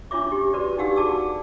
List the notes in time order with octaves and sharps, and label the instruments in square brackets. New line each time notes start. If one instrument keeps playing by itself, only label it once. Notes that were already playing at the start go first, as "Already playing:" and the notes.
[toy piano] C#4 D4 F4 C#5 E5 D6
G4
F#4 A#4 B4 D5
D4 D#4 G4 F5 F#5 E6
F#4 G#4 D5 A5 D6 E6